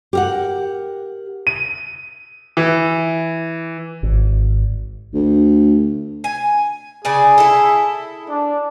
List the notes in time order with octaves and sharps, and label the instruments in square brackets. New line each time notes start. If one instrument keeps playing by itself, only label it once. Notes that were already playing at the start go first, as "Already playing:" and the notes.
[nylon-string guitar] G4 A#4 F#5
[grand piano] D#7
E3
[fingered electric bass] G#1
[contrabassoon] D2
[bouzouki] G#5
[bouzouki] C#3 D5 G#5 [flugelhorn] G#4
[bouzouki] E4 A4
[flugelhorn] D4